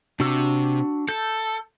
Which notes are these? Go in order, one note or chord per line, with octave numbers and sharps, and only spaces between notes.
C3 D4 F#4 E6
A4 G6